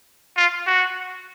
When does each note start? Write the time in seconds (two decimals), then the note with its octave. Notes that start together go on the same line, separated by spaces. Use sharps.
0.37 F4
0.67 F#4